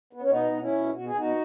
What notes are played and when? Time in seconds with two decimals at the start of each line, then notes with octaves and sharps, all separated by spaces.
0.13 B3
0.22 C#4
0.29 B2 B3 D#4
0.52 B2
0.61 C#4 E4
0.72 B2
0.93 B2 F#4
1.05 G#4
1.15 B2 D#4 F#4